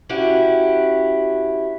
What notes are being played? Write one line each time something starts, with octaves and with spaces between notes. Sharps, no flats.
C#4 E4 F#4 G4